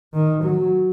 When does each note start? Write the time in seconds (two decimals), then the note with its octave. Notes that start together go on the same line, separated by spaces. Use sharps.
0.13 D#3
0.44 F#3